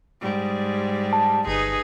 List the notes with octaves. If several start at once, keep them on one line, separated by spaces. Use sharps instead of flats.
G#2 G3
A5
G1 D#4 G#4 B4